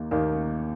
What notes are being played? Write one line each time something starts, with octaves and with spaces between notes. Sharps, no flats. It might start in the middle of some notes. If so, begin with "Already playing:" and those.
Already playing: D#2 D#3 A#3
D#2 D#3 A#3